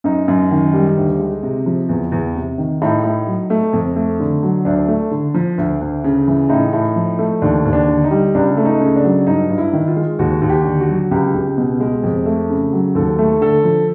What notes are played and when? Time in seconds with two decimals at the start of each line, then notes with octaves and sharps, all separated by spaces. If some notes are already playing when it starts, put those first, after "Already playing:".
0.04 F#2 D#4
0.28 F#2
0.51 D#3
0.74 G3
0.97 D2
1.19 G#3
1.43 C3
1.66 F3
1.89 E2
2.12 E2
2.35 C3
2.58 D#3
2.82 A2 D#4
3.04 A2
3.27 F#3
3.50 A3
3.73 F2
3.96 A3
4.20 D3
4.43 F#3
4.65 D2 D4
4.88 A3
5.11 D3
5.34 F3
5.58 D2
5.81 D2
6.04 C#3
6.28 E3
6.50 A2 D#4
6.73 A2
6.96 F3
7.19 A3
7.42 D#2 D4
7.65 D#2
7.73 D4
7.88 D3
8.04 D#4
8.11 G3
8.35 C#2 D4
8.57 A3
8.65 D#4
8.81 C#3
8.96 D4
9.04 F#3
9.26 G2 D#4
9.50 G2
9.58 E4
9.73 D#3
9.88 F4
9.96 G#3
10.19 D#2 F#4
10.42 D#2
10.49 G4
10.64 D3
10.80 F#4
10.89 F#3
11.11 C#2 G4
11.34 C#2
11.58 B2
11.80 G#3
12.03 F2
12.26 A3
12.50 C#3
12.73 F#3
12.95 D#2 A4
13.19 A3
13.41 D3 A4
13.64 F3